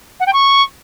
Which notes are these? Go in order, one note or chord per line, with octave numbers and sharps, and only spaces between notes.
F#5
G5
C#6